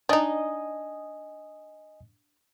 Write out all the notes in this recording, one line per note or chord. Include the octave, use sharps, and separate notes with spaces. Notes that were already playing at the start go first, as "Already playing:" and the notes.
D4 D#4 D#5 G#5 D#6